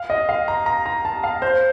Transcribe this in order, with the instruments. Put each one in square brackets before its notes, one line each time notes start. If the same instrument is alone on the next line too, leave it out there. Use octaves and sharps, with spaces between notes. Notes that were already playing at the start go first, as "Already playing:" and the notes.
Already playing: [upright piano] F5
D#5
F5
A#5
A#5
A#5
A5
F5
C5